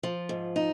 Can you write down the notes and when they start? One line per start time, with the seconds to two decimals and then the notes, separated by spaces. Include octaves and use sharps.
0.03 F3
0.29 G#2
0.56 D#4